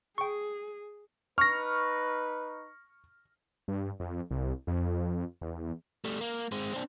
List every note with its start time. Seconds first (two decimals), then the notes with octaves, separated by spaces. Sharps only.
0.18 G#4 G5 C#6
1.38 D#4 B4 C#6 F6 A#6
3.68 G2
4.00 F2
4.31 C2
4.67 F2
5.41 E2
6.05 G3 A3
6.21 A#3
6.52 G#3 C4
6.73 C4 D4